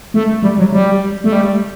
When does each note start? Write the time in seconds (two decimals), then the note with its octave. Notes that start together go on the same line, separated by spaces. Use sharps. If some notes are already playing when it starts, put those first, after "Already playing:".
0.14 A3
0.43 G3
0.58 F#3
0.72 G3
1.24 A3
1.32 G3